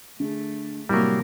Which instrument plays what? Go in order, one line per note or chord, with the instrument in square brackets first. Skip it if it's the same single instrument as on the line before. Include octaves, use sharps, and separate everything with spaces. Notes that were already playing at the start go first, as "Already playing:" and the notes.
[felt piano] D3 G#4 [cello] A3
[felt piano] A2 C3 [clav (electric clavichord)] F#3 G3 [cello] A#3 A#4